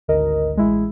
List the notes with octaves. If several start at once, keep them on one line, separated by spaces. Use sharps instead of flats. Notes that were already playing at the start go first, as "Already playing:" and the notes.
G#1 D2 D3 A#4 D#5
A1 G#3 E4